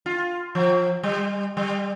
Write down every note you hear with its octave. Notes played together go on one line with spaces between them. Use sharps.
F4
F3
G3
G3